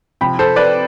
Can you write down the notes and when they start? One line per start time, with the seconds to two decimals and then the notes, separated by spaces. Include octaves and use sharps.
0.21 C3 F3 G5 B5
0.39 A4 C5
0.56 B4 D5